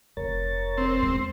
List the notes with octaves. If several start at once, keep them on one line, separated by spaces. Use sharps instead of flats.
F1 A#4 C#5 A6
C4
E2 G#3